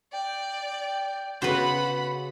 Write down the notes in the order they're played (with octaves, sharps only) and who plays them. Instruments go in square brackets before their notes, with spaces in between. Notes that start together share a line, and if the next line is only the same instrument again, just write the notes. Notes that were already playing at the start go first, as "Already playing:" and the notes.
[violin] D5 [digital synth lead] G5
[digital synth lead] C#3 [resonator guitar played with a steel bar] B3 F#4 [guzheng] B4 C5 [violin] F#5 B5